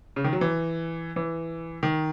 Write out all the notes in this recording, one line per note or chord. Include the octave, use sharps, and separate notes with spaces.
C#3
D#3
F#3
E3
E3
D#3